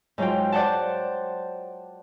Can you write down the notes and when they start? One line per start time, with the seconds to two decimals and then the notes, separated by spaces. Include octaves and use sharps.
0.18 G#2 F#3 F4 G5
0.52 C5 D5 F#5 G5 A5